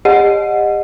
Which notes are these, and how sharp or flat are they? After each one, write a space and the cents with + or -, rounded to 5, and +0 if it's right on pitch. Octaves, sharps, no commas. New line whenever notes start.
G4 +40 D#5 -15 F#5 -15